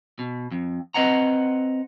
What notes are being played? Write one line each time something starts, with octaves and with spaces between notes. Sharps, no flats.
B2
F2
C4 B4 D#5 F#5 A#5